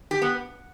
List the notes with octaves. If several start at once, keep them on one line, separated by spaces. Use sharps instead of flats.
G4
B3